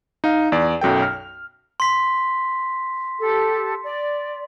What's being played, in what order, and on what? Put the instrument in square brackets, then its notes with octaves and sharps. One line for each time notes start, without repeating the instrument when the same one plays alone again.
[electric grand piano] D#4 F5
E2 D5
B1 F#2 A4 G5
F6
[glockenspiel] C6 B6
[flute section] G4 A4
D5